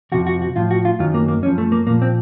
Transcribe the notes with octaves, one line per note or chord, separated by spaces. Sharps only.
F2 C3 F3 F#4
F#4
F#4
A2 F3 F4
F#4
F4
F#2 D#3 F#3 F4
A#3
A#3
F#2 F3 C#4
A3
A#3
A#2 F3 A#3
C4